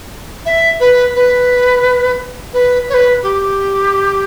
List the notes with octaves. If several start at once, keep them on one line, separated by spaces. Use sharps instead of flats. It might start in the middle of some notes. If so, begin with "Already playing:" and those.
E5
B4
B4
B4
C#5
B4
G4